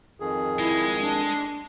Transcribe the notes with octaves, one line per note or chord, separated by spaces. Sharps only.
F2 D#3 G#4
G#3 E4
D4